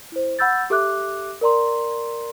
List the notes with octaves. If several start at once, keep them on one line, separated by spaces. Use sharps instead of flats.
E4 C5
F#5 B5 E6 G6 A6
G4 A4 E5 D6 F#6
A#4 D5 A#5 C6